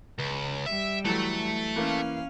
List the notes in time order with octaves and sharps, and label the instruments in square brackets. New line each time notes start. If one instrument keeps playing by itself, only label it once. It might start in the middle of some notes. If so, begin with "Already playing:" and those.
[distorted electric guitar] C#2
[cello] G3 [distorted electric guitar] E5
[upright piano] E3 F#3 [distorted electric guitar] A3 A4
[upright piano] E3 A#3 [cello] C#4 F5